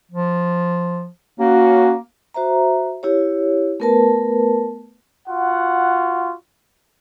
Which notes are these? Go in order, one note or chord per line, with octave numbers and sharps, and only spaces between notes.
F3
A#3 C#4 F#4
F#4 C5 E5 A#5
E4 G4 C#5
A3 B3 A#4 B4 A5
F4 F#4 F#5